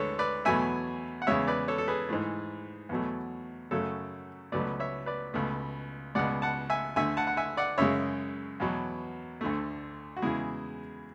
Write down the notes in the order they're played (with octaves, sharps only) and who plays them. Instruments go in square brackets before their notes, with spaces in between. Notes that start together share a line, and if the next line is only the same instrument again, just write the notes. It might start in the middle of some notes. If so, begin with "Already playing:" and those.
Already playing: [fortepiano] D2 D3 G#3 A4 B4 C#5
B4 D5
E2 B2 F#3 A3 E5 G#5
F#5
E2 C#3 G#3 C#5 E5
B4 D5
A4 C#5
A4
G#4 B4
G#2 E3 A3
E2 B2 F#3 A3
F#2 C#3 F#3 A3 A4 C#5
C#2 B2 F#3 A3 B4 D5
C#5 E5
B4 D5
C#2 B2 A3
C#2 B2 G#3 D5 F#5
F#5 A5
E5 G#5
D2 D3 A3 E5 G#5
F#5 A5
F#5
E5 G#5
D5 F#5
F#2 C#3 G#3 C#5 E5
E2 B2 F#3
D2 D3 A3
F#4
E2 C#3 G#3 E4 G#4